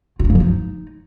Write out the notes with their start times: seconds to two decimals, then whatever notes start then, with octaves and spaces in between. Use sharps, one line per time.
0.19 F4
0.25 D4
0.30 A#3
0.35 F3
0.40 D#4